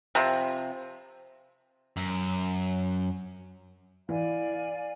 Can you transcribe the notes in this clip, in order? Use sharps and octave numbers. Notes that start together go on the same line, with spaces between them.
C3 F3
F#2
E3 D5 F5 G#5